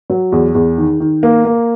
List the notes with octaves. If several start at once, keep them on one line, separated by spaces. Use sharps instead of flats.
F#3
E2
E2
D#3
D#3
A#3
A#3